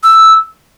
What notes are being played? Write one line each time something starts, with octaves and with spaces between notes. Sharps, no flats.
E6